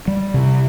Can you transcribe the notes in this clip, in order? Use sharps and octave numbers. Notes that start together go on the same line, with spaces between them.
G3
C3